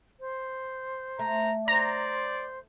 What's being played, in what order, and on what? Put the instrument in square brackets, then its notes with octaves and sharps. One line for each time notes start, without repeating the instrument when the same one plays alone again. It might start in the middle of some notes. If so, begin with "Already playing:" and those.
[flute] C5
[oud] A3 [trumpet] A#5
[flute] C5 [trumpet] D5 [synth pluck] A#5